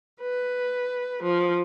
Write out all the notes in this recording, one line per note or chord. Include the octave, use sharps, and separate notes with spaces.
B4
F3